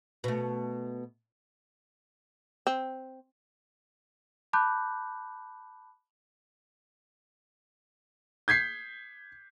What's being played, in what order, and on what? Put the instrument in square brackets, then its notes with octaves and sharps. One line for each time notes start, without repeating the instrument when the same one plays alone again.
[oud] B2 A3
[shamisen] C4
[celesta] A5 B5 D6 F#6 G6
[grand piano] G6 G#6 B6 C7